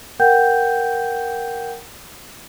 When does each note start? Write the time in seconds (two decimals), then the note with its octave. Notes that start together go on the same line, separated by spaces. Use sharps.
0.20 A#4 F#5 G5 G6